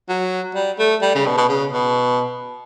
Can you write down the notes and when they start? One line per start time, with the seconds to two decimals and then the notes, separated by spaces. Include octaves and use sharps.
0.09 F#3
0.55 G3
0.78 A3
1.02 G3
1.15 C#3
1.26 B2
1.37 B2
1.49 C#3
1.73 B2